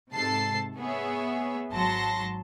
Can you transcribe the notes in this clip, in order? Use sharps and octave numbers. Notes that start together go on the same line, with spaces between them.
G#2 C3 A4 A5 C7
B3 G#4 C#5 E5
G#1 F#3 A5 C6 A#6